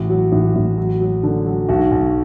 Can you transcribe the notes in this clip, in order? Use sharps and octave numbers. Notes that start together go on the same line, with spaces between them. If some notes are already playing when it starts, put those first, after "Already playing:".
Already playing: A1 F#4
F#3
A1
A1
F#3
F#3
D3
F#3
B1 F#4
B1